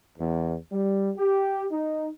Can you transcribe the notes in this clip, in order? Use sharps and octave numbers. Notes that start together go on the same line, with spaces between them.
E2
G3
G4
D#4